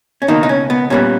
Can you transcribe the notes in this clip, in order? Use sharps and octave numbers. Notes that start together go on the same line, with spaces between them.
C#4
C#2 B2 D#3 A#3 D#4
D#4
C#4
B3
A#2 G3 B3 C#4